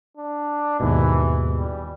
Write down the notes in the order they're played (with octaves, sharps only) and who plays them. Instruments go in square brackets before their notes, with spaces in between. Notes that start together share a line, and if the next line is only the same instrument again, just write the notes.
[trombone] D4
[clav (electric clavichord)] D#2 G#2 B2 [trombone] E3
[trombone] G3